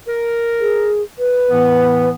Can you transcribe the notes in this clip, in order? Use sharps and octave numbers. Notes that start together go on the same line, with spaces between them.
A#4
G#4
B4
A2 E3 B3